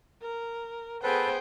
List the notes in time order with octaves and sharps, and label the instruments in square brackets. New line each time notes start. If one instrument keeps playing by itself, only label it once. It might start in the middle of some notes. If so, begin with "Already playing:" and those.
[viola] A#4
[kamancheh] B3 G#4 [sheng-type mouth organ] A4 B4 [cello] C5 [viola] G5